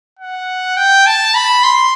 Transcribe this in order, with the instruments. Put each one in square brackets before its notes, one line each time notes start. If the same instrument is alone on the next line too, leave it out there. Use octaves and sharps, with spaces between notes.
[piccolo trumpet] F#5
G5
A5
B5
C6